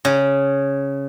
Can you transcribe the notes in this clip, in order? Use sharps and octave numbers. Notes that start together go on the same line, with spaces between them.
C#3